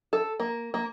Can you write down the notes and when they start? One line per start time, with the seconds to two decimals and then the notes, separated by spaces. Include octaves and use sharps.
0.13 A4
0.40 A#3
0.74 A#3